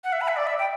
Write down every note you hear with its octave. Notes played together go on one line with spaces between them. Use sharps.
F#5
E5
B5
E5
D5
E5
G5